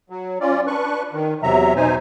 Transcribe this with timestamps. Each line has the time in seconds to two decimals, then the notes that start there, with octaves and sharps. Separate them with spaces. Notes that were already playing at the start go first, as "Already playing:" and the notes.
0.10 F#3
0.41 C#4 F4 D5
0.67 D4 B4 C#6 F#6
1.12 D#3
1.43 E2 C3 F#3 E5 A#5
1.76 B2 D#4 C5 G#5